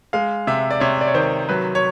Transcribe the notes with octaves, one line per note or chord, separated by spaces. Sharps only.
G#3 F5
C3 E5
D5
C3 C#5
D5
C#5
D#3 C5
F#3 B4
C#5